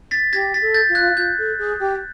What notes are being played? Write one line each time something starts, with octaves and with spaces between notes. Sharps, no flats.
A6 B6
G4 G#6 A#6
A6 B6
A4
G6 A6
F4
F#6 G#6
F4 G6
A4
G#4
G4